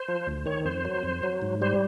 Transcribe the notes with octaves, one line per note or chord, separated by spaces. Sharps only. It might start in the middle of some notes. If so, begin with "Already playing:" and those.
Already playing: C5
F3
D2
D#3 C#5
F2 C5
F#3
F2
F#3
G#2
G3 C5